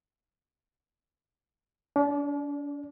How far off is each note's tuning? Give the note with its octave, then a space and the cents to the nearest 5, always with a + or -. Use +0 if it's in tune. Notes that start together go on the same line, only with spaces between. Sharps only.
D4 -40 D5 +0